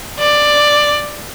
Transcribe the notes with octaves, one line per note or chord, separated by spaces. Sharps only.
D5